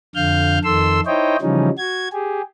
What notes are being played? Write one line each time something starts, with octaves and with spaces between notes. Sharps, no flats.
F2 D3 F5 F6 G6
F2 D#3 A4 C6 E6
D#4 E4 C5 C#5 D#5 G5
C#3 E3 F3 G3 C#4 D#4
F#4 G#6
G4 G#4